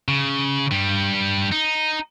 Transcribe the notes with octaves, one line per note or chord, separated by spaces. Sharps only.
C#3
G2 G3
D#4